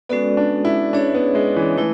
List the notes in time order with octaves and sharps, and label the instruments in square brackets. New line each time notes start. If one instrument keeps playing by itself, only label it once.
[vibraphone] G#3 C#4 F#4 A4 D5 [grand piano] B3
[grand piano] D4
E4
[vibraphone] C#4 G#4 C#5 E5 [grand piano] D4
[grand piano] B3
G#3
E3
[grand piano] E3 [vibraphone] A3 E4